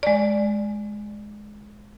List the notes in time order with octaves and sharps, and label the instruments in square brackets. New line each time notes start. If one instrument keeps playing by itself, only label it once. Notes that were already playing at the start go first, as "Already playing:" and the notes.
[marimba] G#3 D5